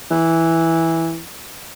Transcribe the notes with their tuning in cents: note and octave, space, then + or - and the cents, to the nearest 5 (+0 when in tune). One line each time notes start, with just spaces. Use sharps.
E3 -5